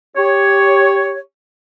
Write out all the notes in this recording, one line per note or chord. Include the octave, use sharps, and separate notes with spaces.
G4 C#5